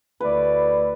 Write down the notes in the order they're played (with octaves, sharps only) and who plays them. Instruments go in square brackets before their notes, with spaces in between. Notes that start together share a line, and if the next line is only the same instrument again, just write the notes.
[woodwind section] D2 D3 A3 E4 D5 [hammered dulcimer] B4